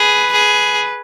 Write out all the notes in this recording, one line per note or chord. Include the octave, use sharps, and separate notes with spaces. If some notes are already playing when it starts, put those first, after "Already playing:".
Already playing: G#4 B4
G#4